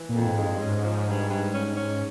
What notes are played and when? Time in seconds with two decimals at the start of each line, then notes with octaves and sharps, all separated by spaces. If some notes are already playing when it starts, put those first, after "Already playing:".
Already playing: E3
0.09 A#2
0.15 F2
0.26 G#2
0.37 G#3
0.43 G2
0.60 G#2 C#4
0.84 F3
1.07 G2
1.30 G2
1.54 C#4
1.76 C#4